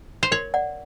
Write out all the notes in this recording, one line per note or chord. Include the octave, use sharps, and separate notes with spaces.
C5
A#4 C#5
D5 F#5